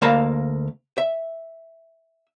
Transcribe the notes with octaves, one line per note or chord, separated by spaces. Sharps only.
D2 A#3 A#4 F5 A5 B5
E5